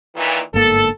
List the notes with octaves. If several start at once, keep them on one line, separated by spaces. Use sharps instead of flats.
A#2 D#3 E3
G1 G#2 A#3 A4